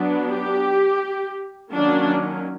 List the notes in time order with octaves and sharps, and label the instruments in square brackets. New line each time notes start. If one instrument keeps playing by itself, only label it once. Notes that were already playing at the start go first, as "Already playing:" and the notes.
Already playing: [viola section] F#3 B3 D4
G4
D#3 F#3 A#3 C#4 D4